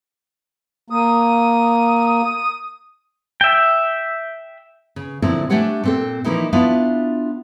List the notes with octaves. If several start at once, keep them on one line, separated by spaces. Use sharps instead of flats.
A#3 D#6
E5 G5
C#3
A#2 D3 F3 C4 E4
A3 D4 G4 C#5 F#5 G#5
A#2 C4 A4
E3 F3 A#3 D#4 E4
B3 D4 E4 F4 F5